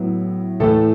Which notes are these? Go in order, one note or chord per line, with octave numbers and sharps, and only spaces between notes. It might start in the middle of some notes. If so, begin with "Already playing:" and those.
Already playing: A2 F#3 B3 E4
A2 E3 A3 A4